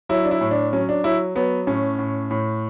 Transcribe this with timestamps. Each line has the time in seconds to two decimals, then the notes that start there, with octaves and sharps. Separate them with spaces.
0.09 F#3 E4
0.25 D4
0.31 E4
0.41 A2
0.51 D4
0.73 F#3 C#4
0.89 D4
1.04 F#3 E4
1.35 F#3 B3
1.67 A2 C#4
1.99 A2
2.31 A2